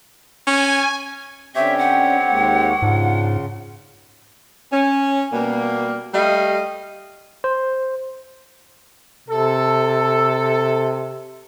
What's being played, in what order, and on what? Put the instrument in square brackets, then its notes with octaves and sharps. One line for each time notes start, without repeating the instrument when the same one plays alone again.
[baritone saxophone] C#4 [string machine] G#5
[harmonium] D3 C#4 G5 [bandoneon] C4 G4 C#5 [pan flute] E5
[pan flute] F#5
[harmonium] D#2 G#3 A#3
[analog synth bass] G#2 [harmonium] C#3 F4 [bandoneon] D4
[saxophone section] C#4
B2 G3 A#3
G3 A3 D#5 F5
[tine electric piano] C5
[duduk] C3 [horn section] A4